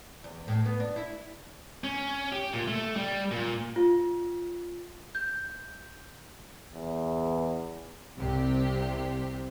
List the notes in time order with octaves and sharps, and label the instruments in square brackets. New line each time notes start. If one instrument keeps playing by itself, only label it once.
[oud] E2
A2
B3
D4
E4
[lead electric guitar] C#4
G4
A#2
A3
G3
A#2
[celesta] F4
G6
[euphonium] E2
[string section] C2 C3 G4